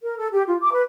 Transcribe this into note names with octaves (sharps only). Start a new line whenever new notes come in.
A#4
A4
G4
F4
D6
B4